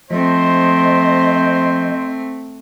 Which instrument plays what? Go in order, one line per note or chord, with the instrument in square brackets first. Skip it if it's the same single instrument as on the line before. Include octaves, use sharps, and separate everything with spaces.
[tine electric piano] F3 [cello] A3 C4 [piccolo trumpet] C5 [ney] D#5